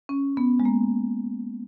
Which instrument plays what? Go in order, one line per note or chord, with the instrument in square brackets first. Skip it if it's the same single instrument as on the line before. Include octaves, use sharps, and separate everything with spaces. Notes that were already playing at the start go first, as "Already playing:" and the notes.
[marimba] C#4
B3
G#3
A#3